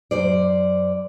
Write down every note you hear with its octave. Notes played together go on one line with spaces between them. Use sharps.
F#2 C5 D5